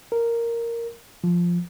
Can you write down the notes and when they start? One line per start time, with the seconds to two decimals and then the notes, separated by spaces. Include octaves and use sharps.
0.12 A#4
1.24 F3